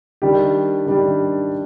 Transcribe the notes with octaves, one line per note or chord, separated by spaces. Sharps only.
D#3 G3 D4 G4
D#3 G3 D4 G4